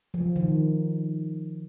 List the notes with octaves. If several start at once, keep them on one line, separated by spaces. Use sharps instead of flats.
F3
D#3